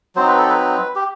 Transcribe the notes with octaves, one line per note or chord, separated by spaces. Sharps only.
F#3 C4 D#4 C5
B4
A4
B4
G4